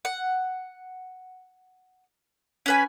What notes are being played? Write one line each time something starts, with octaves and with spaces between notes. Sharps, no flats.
F#5
C#4 B4 G#5